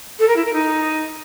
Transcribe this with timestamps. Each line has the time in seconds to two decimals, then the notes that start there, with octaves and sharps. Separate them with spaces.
0.19 A4
0.27 A#4
0.36 E4
0.44 A#4
0.53 D#4